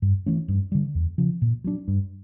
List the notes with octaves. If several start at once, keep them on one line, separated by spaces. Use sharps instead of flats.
G2
E3 A3 C#4
G2
D3 G3
E2
C#3 F3
A#2
F#3 A#3 D4
G2